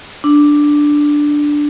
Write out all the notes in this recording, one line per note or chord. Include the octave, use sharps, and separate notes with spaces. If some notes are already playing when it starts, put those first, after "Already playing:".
D4